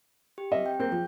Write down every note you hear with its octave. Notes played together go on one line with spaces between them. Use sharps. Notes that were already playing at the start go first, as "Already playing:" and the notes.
G4
C4 D#5 E5
G5
A#3 C4 G#4 G6
F3